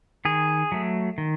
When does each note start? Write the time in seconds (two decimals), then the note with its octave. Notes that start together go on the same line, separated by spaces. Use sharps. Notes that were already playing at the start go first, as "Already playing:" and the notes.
0.25 D#3 G#4
0.72 F#3 A3
1.18 D#3